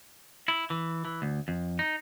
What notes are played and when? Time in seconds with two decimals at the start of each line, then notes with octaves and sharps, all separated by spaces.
0.48 E4
0.70 E3
1.05 E3
1.22 D2
1.48 F2
1.79 D#4